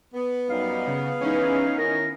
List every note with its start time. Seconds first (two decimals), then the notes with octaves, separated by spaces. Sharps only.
0.14 B3
0.50 F#2 G3 D#4 F5
0.87 C#3
1.21 E3 G#3 C#4 D#4 B4
1.78 D#3 E4 A#4